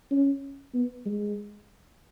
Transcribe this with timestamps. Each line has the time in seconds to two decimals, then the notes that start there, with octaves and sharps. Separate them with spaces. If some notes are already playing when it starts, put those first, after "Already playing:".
0.11 C#4
0.74 B3
1.06 G#3